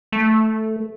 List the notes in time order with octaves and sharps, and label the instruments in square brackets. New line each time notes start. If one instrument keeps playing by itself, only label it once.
[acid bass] A3